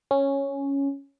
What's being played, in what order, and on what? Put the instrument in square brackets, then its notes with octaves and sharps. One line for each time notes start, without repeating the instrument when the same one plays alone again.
[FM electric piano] C#4